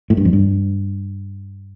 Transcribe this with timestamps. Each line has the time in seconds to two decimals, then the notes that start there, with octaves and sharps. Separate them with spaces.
0.10 A2
0.17 G2
0.25 F2
0.33 G2